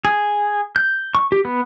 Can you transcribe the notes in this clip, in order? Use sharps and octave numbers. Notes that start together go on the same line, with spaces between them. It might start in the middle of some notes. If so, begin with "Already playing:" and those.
G#4
G6
C#6
G4
B3